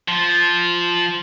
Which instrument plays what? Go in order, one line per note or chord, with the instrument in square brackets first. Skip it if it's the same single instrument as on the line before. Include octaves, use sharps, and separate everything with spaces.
[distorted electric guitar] F3